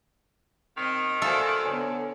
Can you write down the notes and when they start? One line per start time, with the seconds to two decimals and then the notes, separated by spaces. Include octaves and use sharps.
0.77 D#3 C4 D#5
1.22 F#4 A4 C5 D5 E5 F5 G#5
1.66 D3 B3 C#5 G#5